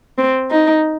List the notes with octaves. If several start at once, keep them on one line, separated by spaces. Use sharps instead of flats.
C4
D#4